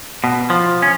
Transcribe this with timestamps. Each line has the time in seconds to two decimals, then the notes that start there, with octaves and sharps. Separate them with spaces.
0.24 B2
0.50 F3
0.82 C#4